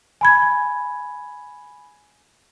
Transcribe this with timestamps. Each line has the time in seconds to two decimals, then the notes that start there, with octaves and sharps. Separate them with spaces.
0.21 G#5 B5 G#6